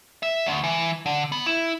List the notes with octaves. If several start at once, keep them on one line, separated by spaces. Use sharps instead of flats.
E5
D2
E3
D3
B3
E4